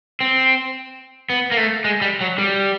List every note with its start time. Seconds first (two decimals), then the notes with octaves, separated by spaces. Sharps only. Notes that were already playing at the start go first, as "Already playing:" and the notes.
0.21 C4
1.30 B3
1.52 A#3
1.57 A3
1.84 G#3
2.01 G3
2.21 F#3
2.38 G3